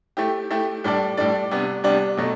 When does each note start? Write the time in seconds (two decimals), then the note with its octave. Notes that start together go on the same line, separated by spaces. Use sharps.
0.17 A3 E4 G4
0.51 A3 E4 G4
0.84 A2 G3 D4 A4 D5
1.17 A2 G3 D4 A4 D5
1.51 C3 G3 B3 D4
1.84 C3 G3 B3 D4
2.17 B2 F#3 A3